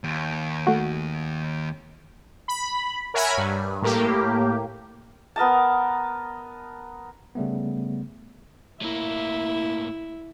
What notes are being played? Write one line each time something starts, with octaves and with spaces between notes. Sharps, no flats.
D#2
A3 F#4
B5
A#4 C#5 E5 F#5 G#5 B5
G2
A2 A#3 G4
B3 A#4 D#5 A5
C#3 G3 A3 B3
A2 A#3 E4 E5